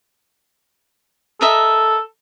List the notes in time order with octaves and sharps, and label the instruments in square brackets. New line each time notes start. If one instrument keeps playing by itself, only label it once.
[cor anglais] A4 [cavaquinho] A#4 D#5 E5